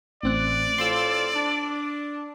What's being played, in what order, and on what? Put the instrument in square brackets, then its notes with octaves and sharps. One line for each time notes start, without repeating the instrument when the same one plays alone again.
[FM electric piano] A1 C4 F#6 [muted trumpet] D5
[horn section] A2 C4 F4 [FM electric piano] C6 E6
[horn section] D4